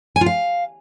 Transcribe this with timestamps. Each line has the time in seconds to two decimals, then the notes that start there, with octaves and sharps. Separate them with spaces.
0.16 G#5
0.21 F4
0.26 F5